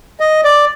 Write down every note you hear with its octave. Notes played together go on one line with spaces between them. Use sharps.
D#5
D5